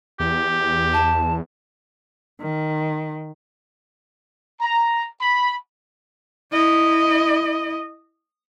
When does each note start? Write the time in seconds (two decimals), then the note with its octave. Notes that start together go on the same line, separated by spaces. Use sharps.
0.20 E2 G4
0.94 A5
2.42 D#3
4.61 A#5
5.21 B5
6.52 E4 D#5